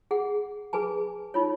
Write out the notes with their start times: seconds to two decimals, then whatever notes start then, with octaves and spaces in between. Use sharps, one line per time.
0.11 G#4 F#5
0.73 G#4 B4 G#5 A5
1.34 D#4 F4 C#5